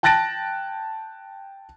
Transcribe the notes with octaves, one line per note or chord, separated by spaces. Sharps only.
G5 A5 F#6 A6 A#6 D7